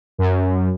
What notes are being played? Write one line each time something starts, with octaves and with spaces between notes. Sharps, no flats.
F#2